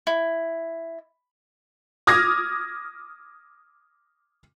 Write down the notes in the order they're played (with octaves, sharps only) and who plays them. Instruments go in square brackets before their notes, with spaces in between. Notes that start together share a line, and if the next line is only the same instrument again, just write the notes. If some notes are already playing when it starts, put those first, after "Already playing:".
[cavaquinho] E4
[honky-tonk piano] D6 D#6 F6 G#6 A#6